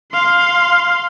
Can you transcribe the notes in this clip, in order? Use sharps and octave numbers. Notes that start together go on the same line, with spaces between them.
F5 C6